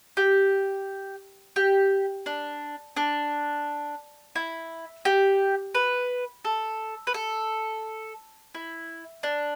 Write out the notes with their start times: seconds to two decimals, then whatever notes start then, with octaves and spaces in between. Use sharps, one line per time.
0.17 G4
1.56 G4
2.26 D4
2.97 D4
4.36 E4
5.05 G4
5.75 B4
6.45 A4
7.07 B4
7.14 A4
8.55 E4
9.23 D4